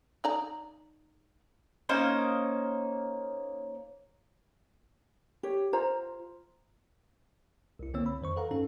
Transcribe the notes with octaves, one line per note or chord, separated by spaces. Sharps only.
D#4 D5 A#5
A#3 C#4 D#4 C5
G4 C#5
F4 C5 A#5
C2 E4
C#2 D3 A#3 C4 C#5 E6
B5
F2 D#3 C5 C#6
A4 B4 F5 F#5 A#5
G2 C#4 D#4 A4